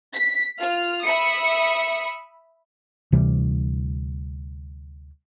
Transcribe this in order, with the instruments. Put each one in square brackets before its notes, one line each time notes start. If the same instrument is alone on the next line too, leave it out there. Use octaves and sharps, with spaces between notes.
[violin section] B6
F4 F6
E5 B5 D#6 C#7
[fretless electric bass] D2 C3 E3 G3